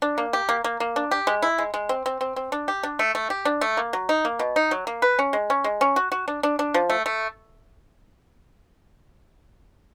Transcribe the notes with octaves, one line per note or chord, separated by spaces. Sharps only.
D4
A#3
G4
A#3
A#3
A#3
D4
G4
G#3
E4
G#3
G#3
C4
C4
C4
C4
D4
G4
D4
A3
A3
G4
D4
A3
A#3
F#3
D#4
A#3
B2
D#4
F#3
A#3
B4
C#4
G#3
C#4
G#3
C#4
F#4
F#4
D4
D4
D4
F3
A3
A3